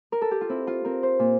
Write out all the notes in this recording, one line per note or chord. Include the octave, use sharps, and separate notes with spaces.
A#4
A4
G4
F4
C4 E4
F4
C4 A#4
C5
A#2